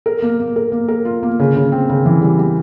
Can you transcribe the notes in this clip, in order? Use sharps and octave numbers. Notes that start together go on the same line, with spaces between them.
A#4
A#3
A#3
A#4
A#3
A#4
F4
A#3
C#3
C#3
C4
C#3
E3
G3
G3